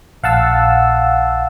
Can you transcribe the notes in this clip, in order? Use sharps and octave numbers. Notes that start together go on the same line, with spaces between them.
A#1 F5 F#5 A5 E6